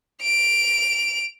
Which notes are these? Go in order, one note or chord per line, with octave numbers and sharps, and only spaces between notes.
D7 F7